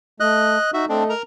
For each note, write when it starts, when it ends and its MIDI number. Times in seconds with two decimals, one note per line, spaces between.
0.20 0.57 57
0.20 0.71 75
0.20 0.71 90
0.74 0.86 63
0.74 0.85 66
0.74 0.85 76
0.89 1.13 57
0.89 1.04 60
0.89 1.04 62
0.89 1.13 69
0.89 1.13 75
1.09 1.22 70
1.09 1.22 82